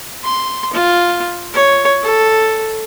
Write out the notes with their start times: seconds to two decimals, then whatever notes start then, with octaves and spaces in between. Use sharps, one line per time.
0.24 C6
0.73 F4
1.54 C#5
2.03 A4